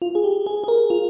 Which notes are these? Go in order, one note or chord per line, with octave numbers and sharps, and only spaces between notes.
F4
G#4
G4
G#4
G#4
A#4
F4